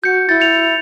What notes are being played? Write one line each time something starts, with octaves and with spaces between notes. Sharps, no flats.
F#4 G6 C#7
E4 G6 A6
G6 C#7 F7